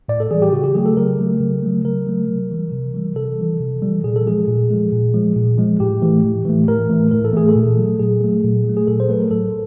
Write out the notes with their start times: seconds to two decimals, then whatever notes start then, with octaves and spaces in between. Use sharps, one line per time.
0.09 A2 D5
0.20 A4
0.31 E3 G3 G#4
0.42 G4
0.52 C#3 F#4
0.64 G4
0.75 F#3 A3 G#4
0.86 A4
0.97 C#3 A#4
1.19 F#3 A3
1.40 C#3
1.63 F#3 A3
1.84 C#3 A#4
2.07 F#3 A3
2.28 C3
2.51 E3 G3
2.72 C3
2.94 E3 G3
3.16 C3 A4
3.38 E3 G3
3.60 C3
3.82 E3 G3
4.04 A#2 G#4
4.16 A4
4.26 F3 G#3 G#4
4.48 A#2
4.71 F3 G#3
4.92 A#2
5.14 F3 G#3
5.36 A#2
5.58 F3 G#3
5.80 A2 G4
6.02 E3 A3
6.23 A2
6.45 E3 A3
6.68 A2 A#4
6.90 E3 A3
7.11 A2 A#4
7.25 A4
7.33 E3 A3 G#4
7.49 A4
7.55 A#2
7.77 F#3 A3
7.99 A#2 G#4
8.21 F#3 A3
8.44 A#2
8.65 F#3 A3
8.77 G#4
8.87 A#2 A4
9.00 C5
9.09 F#3 A3 B4
9.20 A#4
9.31 A2 A4